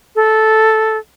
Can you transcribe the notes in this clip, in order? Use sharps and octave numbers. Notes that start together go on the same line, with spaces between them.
A4